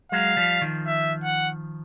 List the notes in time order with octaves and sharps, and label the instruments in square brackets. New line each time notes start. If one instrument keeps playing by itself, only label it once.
[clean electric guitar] F#3 G#3 [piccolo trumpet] F5
[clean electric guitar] F3 G3
D#3 F3
[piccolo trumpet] E5
F#5